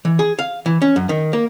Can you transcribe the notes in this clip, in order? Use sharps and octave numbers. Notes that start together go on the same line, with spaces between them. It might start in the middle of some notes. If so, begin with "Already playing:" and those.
E3
G#4
F5
E3
C#4
F#2
D#3
A#3